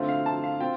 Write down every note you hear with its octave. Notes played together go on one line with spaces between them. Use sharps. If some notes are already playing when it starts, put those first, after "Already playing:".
Already playing: D3 A3 C4 F4
F5
A5
F5
C4 F4 G5